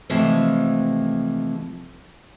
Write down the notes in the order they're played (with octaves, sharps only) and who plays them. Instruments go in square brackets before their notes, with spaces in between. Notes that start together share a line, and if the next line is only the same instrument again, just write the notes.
[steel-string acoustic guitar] C3 E3 F3 G#3 A3